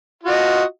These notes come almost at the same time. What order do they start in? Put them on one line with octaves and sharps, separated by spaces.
F4 F#4 D#5